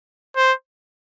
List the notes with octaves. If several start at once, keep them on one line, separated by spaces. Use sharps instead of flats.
C5